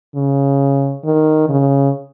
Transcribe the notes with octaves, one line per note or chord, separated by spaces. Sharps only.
C#3
D#3
C#3